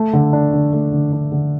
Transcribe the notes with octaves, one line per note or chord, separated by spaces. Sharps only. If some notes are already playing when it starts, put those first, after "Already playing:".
Already playing: A3
D3
D4
D3
A3
D3
D4
D3